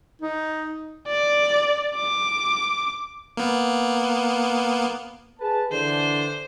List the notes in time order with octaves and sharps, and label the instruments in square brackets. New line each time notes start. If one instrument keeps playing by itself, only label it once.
[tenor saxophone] D#4
[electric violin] D5
D6
[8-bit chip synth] A#3 B3
[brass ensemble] G#4 B4 A5
[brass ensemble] D3 E3 D4 [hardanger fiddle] C5